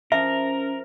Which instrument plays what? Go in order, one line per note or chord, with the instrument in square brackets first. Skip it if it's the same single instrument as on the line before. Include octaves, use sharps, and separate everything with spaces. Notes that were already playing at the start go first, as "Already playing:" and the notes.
[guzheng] F3 [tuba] C#4 [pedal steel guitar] A#4 [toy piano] E5